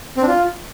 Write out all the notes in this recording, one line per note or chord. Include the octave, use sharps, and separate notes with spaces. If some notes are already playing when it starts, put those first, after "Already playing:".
C4
D4
F4